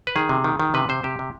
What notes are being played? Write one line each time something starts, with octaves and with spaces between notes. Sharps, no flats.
B4
D#3 G#4
C3
D#3
D#3
C3 B4
C3 C5
C3 G4
C3